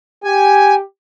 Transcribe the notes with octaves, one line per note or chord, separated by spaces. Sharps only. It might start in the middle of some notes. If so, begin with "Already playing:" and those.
G4 G#5